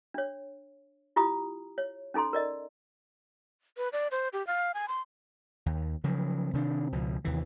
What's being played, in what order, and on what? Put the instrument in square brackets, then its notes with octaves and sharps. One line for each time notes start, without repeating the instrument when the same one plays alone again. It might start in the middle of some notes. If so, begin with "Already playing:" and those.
[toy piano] D4 C#5
E4 F4 G4 A#5 D#6
C#5
C#4 D#4 A4 A#5 C6
A#4 D5 D#5
[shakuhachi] B4
D5
C5
G4
F5
G#5
C6
[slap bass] D#2
C#3 F3 F#3
C3 D#3 D4
C#2 B2 F3
D#2 C3 E3